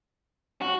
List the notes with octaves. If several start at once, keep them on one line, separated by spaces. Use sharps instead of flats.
F#4